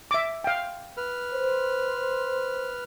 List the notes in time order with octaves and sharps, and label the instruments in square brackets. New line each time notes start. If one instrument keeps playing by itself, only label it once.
[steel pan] E5 D6
F5 G5
[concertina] B4 F6
[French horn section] C5